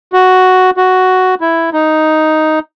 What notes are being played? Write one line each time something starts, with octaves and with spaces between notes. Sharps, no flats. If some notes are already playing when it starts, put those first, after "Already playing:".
F#4
F#4
E4
D#4